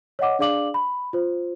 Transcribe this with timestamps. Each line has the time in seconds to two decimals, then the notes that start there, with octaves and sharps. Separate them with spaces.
0.19 C#5 D#5 F#5 D6
0.39 D4 G#4 D5 F5 D6 F#7
0.74 B5
1.13 F4 C5